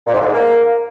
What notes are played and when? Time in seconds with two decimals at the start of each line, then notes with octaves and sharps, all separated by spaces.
0.06 A#2
0.13 G#2
0.20 D3
0.26 G#2
0.33 A#3